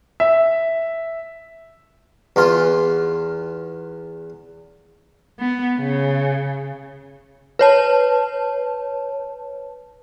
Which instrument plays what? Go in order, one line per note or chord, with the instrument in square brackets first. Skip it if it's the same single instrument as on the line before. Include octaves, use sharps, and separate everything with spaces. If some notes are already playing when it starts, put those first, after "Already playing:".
[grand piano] E5
[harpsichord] E2 F4
[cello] B3
C#3
[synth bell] B4 C#5 A5